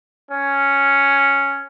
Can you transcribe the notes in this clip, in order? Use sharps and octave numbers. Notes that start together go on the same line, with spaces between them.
C#4